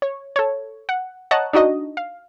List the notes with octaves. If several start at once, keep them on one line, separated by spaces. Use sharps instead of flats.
C#5
A4 C#5
F#5
C#5 D#5 F#5 A5 A#5 F#6
D4 D#4 F#4 D#5
F5